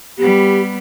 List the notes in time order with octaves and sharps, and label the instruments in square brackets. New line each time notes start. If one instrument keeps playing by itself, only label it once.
[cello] G3 B3 [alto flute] G4